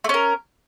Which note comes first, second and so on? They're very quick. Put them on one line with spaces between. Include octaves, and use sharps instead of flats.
A3 C#4 A#4